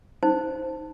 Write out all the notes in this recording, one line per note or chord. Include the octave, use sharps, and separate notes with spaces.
D#4 C5